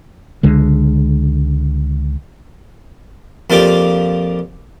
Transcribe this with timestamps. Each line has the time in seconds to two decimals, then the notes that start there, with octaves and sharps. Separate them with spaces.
0.43 C#2 D3 G#3
3.50 F2 A#3 F4 G4 D5 D6